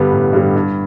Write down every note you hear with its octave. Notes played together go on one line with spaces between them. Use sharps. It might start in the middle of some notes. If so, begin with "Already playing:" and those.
Already playing: G2 D3 G3 B3
A1
G2 D3 G3 B3
G2